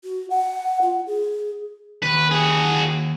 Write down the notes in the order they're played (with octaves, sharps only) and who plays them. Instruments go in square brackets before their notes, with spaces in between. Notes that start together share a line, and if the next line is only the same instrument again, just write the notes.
[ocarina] F#4
F#5
F4
G#4
[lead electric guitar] D#2 [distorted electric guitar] B4
[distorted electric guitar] F#4 G#4